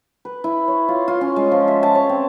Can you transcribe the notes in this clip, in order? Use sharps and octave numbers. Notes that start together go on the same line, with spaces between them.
B4
E4
C#5
F4
F4
C#4
G#3
F3
E5
A5
C#5
C4